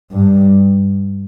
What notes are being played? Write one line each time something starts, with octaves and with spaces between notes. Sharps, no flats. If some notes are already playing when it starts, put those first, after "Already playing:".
G2